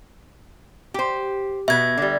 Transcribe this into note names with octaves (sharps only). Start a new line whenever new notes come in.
G4 C5
B2 B3 E5 G#6
D3 G3